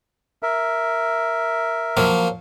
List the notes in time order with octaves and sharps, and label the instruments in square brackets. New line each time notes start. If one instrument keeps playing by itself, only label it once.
[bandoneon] A#4 E5
[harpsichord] F3 F#3 A#3